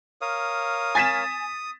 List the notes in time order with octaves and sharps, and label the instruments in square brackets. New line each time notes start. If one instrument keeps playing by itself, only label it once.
[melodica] A#4 C#5 F5 [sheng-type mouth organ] D#6
[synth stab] G#5 [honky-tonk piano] A6 B6 E7